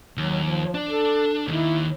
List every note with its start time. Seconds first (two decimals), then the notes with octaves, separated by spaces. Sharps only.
0.17 D#2 F#3
0.44 F3
0.75 D4
0.89 A4
1.48 D#2 D#3 E4